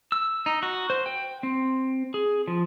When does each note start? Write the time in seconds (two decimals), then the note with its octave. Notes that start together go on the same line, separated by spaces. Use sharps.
0.12 E6
0.46 D#4
0.63 F#4
0.90 C5
1.06 G5
1.43 C4
2.14 G#4
2.48 F3